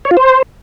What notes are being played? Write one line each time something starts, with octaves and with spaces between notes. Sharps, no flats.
C#5
F4
C5